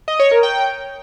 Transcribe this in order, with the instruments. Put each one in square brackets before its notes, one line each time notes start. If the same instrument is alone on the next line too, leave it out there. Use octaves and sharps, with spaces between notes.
[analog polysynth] D#5
C#5
A#4
G5